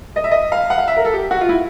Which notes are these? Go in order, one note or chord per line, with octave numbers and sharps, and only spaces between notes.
D#5
E5
D#5
F5
F#5
F5
E5
A#4
A4
G4
F#4
F4
E4